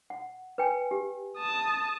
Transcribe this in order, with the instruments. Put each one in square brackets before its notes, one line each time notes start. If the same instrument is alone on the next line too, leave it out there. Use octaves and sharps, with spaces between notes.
[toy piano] F#5
B4 G5 G#5
G4
[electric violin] A5 D#6